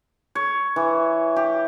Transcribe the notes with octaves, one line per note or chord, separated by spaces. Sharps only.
C#5
E3
G4